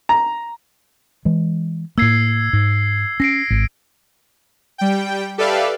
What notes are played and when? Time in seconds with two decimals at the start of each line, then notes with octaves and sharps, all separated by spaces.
0.09 A#5
1.25 E3 G#3
1.98 A2 A#3 E6 G#6 C7
2.53 G#2
3.20 C#4 A#6 C7 D7
3.50 G#1
4.78 G3 G5
5.38 G4 A4 B4 D5 E5 F5